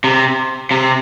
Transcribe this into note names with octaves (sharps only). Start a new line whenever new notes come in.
C3
C3